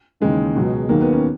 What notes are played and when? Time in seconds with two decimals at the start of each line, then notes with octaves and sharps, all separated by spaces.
0.20 D#2 C#3 E3 G#3
0.55 C#2 B2 F#3
0.89 D#2 D#3 F#3 A#3
1.01 B3
1.12 C#4